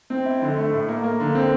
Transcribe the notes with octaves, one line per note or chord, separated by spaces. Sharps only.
C4
E4
D3
A3
A2
A#3
A#3
D3
C4